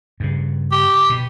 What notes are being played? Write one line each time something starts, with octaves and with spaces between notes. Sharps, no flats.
G2 C#3
G4
B2